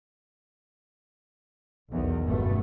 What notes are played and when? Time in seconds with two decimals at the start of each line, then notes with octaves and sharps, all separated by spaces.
1.90 B1 E2 D#3
2.24 F#1 B1 G2 A#2 A3 B3